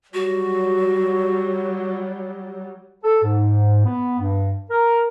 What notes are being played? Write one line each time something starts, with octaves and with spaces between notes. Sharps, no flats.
F#3 G3 F#4
A4
G#2
B3
G2
A#4